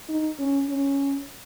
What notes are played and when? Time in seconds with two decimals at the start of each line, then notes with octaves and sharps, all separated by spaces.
0.09 D#4
0.39 C#4
0.69 C#4